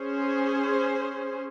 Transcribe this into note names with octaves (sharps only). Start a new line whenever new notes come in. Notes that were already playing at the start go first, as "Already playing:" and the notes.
Already playing: C#4 G#4 C5